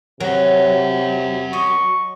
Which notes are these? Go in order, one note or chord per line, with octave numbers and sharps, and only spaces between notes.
C3 F#3 A#4 F#5
D#5 C#6